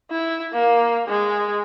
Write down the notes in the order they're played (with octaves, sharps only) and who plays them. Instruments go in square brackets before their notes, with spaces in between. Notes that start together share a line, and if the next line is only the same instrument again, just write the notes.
[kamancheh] E4
A#3
G#3